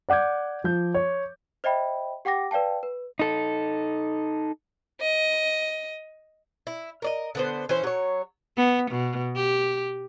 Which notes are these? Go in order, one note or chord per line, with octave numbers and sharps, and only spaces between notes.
D5 F#5 D6 G6 G#6
F3 G6
C#5
C5 D#5 E5 G5 B5
G4 F#5 G5 D6 A#6
B4 D5 F5 G5 A5
B4
D#4 A4
D#5
E4
A#4 D5 D#5
D3 B3 C5
E3 C#4 C5
F#3 C#5
B3
B2
G4